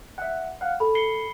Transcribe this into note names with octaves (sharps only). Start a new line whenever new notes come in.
E5 F#5
F5 F#5
A4 B5
C7 C#7 G7